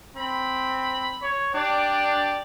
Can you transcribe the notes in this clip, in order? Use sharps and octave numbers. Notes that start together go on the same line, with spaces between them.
C4 B5
C#5
D4 G4 D5